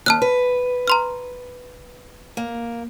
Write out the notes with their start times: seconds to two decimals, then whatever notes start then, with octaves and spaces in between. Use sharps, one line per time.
0.06 D#2 A5 F6 F#6
0.22 B4
0.88 A#5 C6 F6
2.37 A#3